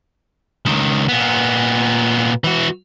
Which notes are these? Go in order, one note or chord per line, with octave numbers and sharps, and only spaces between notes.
C#2 D#3
A#2 B3
E3 F#4